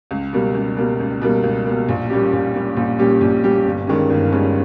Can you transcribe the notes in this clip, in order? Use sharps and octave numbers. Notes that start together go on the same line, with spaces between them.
C#2
B2 G3 A#3
C#2
B2 G3 A#3
C#2
B2 G3 A#3
C#2
B2 G3 A#3
A#1
A#2 G3 C#4 G4
A#1
A#2 G3 C#4 G4
A#1
A#2 G3 C#4 G4
A#1
A#2 G3 C#4 G4
G1
G2 D#3 G#3 C#4
G1
G2 D#3 G#3 C#4